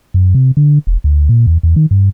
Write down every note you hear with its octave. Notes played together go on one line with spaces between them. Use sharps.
F#2
C3
D3
E1
D2
A#2
E2
E2
D#3
G2